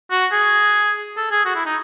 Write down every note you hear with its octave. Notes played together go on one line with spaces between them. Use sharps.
F#4
G#4
A4
G#4
F#4
E4
D#4